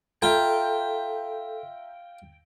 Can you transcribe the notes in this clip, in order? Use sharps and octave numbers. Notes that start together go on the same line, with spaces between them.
F4 A4 E5 G5 A#5